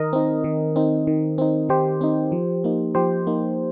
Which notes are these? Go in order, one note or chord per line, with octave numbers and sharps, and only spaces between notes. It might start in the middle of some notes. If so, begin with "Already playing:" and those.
Already playing: D#3 A#4 D#5
C4 D#4
D#3
C4 D#4
D#3
C4 D#4
D#3 G4 C5
C4 D#4
F3
A#3 D#4
F3 G4 C5
A#3 D#4